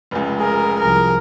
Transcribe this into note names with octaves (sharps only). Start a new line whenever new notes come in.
F1 C#2
G#4 A#4
C2 F3 A#4